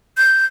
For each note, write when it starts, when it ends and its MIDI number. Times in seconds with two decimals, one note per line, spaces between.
0.17 0.45 91